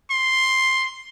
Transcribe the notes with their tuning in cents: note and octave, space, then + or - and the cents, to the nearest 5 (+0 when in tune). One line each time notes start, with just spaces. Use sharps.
C6 +5